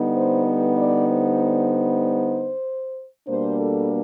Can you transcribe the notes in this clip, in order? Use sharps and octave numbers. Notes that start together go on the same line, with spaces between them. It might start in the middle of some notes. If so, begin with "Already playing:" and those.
Already playing: D3 G3 B3 D#4
C5
B4
D5
C5
B2 G3 A#3 D4 C5
A4